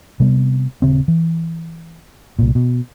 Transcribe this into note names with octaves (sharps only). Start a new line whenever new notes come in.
C3 G3 B3
D#1 C#3 C4
E3
C2 A#2
B2